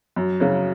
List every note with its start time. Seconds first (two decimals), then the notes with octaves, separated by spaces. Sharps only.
0.16 F#2
0.40 C#3 F#3